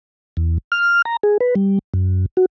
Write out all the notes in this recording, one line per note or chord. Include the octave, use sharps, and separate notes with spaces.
E2
F6
A#5
G#4
B4
G3
F#2
F#4